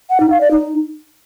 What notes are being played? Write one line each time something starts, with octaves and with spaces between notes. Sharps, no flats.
F#5
D#4
F5
D5
D#4